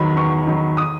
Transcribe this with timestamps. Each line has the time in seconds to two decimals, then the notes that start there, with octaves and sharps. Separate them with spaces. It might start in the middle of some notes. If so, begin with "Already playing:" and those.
Already playing: E2 D#3 F#3 B5
0.16 E2 C#6
0.47 D#3 F#3
0.77 D#6